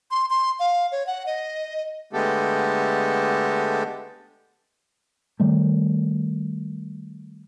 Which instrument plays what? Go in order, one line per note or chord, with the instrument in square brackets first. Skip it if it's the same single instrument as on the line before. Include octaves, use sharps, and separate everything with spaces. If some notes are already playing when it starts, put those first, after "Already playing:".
[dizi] C6
C6
F5
C#5
F#5
D#5
[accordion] D3 G#3 A3 B3 G4 A4
[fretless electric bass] D#3 G3 A3